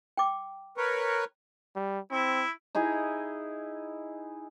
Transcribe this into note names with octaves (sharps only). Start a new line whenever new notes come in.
G5 D6
A#4 B4 C#5
G3
C4 E4
D#4 E4 G#4 D#5